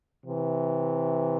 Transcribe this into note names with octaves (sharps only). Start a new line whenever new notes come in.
C3 E3